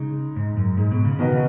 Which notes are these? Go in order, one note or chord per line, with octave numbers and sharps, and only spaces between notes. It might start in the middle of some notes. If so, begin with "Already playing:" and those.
Already playing: C#3 G#3 D#4
G#2
F#2
G#2
B2
C#3
B2 D#3 B3 F#4 B4 D#5
C#3